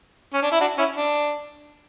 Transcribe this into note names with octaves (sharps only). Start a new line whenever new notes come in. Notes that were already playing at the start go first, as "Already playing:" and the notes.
C#4
D4
E4
D4 F#4
C#4 E4
D4